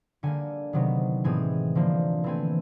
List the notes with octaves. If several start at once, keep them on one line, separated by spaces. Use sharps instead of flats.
D3 G3 A#3 G#5
C3 D#3 F#3 B3
A2 E3 G#3 C4 G#5
D3 F3 A#3
E3 A3 C4 G#5